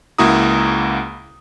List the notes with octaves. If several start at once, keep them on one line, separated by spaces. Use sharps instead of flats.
C#2 A#3 E4 F#4 A#5 D#6